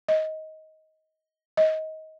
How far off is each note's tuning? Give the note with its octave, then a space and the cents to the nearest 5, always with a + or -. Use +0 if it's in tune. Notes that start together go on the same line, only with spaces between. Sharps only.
D#5 +15
D#5 +20